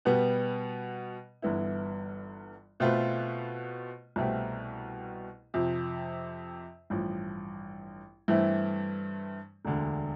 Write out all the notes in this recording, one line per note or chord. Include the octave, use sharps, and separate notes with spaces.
B2 G3 B3
G1 G2 E3 B3 E4
B2 A3 C4 F4 B4
C2 B2 A3 C4 G4
F2 C3 F3
A1 G2 F3
G2 E3 A3 C4 E4
E1 D2 D3